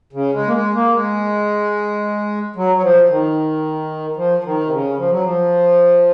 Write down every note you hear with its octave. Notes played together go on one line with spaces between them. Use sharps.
C#3
G#3
A#3
G#3
A#3
G#3
F#3
F#3
F3
D#3
F3
F3
D#3
C3
C#3
F3
F#3
F3